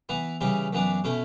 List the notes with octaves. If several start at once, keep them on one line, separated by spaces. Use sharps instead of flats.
E3 B3 E4
C#3 E3 G3 C#4 E4
F#2 E3 B3 D4
B2 A3 C#4 E4